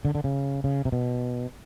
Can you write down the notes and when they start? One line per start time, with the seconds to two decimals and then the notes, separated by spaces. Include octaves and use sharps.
0.05 D3
0.15 D3
0.24 C#3
0.64 C#3
0.85 C3
0.92 B2